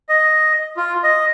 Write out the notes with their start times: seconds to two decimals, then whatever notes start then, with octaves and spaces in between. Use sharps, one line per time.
0.09 D#5
0.77 F4
1.04 D#5